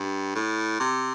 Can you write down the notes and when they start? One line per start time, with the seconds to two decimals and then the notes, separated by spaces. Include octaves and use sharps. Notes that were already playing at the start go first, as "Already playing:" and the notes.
Already playing: G2
0.35 A2
0.80 C3